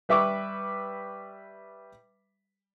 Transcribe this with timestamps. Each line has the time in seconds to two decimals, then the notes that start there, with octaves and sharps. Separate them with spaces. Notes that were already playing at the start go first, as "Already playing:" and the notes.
0.09 G3 B4 E5 C#6 D6